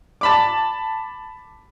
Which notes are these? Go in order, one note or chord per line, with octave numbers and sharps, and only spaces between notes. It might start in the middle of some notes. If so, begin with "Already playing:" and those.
A5 B5 D6